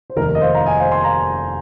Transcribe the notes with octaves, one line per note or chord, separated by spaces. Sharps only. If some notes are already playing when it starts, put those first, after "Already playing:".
C5
F1 D#2 D#3 A#4
D#5
C5 F5
F5 A#5
D#5 G#5
C5 F5
G#5 C6
F5 A#5